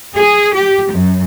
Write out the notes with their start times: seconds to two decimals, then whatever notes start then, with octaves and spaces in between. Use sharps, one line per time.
0.18 G#4
0.53 G4
0.90 F#2